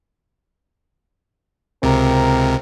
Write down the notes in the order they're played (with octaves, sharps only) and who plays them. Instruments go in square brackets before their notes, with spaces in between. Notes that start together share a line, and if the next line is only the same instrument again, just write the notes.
[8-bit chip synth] C#2 C3 [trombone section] C4 A#4